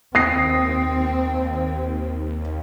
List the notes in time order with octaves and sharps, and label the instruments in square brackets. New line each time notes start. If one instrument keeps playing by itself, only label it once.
[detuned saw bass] D#2 [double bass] C4 [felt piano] D#6 A#6 C7